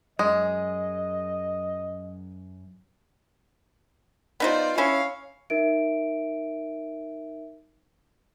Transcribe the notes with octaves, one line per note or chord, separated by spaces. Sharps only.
F#2 G#3 D#5
B3 D#4 F4 C5 D5
C#4 E4 C#5 F5
D#4 A#4 E5 D7